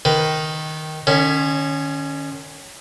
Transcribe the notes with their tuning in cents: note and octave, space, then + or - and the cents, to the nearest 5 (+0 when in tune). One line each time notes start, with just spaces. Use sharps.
D#3 +0 B4 +20
D#3 -40 C#4 +0